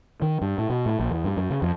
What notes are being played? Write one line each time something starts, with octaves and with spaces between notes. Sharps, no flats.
D#3
G2
A2
B2
A2
A#1
E2
G2
F#2
C#3
F2